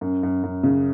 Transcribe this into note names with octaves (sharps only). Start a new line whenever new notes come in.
F#2
F#2
F#2
C#3